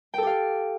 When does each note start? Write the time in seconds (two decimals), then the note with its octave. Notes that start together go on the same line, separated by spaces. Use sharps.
0.14 G5
0.18 A4
0.22 G4
0.27 F5